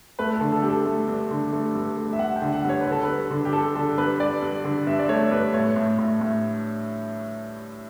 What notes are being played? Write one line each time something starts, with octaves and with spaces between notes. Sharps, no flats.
A3 B4
A4
D3
A4
G2 G4
A4
A3
G2
D3
A3
G2
A3
E5
G2 F#5
G5
D3
F#5
G2
C#5
B4
D3
A4
G2 B4
D3
G4
G2 A4
D3 A4
G2 B4
G2 D5
G2
D3
G2 E5
D5
A3 C#5
G2 B4
A2 C#5
A2
A2
A2